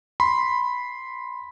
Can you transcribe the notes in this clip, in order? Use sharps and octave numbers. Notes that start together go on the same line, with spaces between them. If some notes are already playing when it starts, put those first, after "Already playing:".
B5 C6